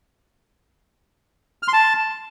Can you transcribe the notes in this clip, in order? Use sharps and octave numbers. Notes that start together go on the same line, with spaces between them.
F6
C6
A5